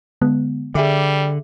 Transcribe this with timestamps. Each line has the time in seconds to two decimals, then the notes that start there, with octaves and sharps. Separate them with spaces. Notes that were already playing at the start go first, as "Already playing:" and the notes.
0.22 D3 G#3 B3
0.75 D3 G3 G#4 E5 D6